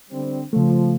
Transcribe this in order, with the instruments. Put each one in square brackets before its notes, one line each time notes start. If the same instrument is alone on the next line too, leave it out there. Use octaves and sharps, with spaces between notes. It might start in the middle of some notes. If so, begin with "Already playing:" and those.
[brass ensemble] D3 G3 C4
[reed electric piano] C#3 A3 [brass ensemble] F3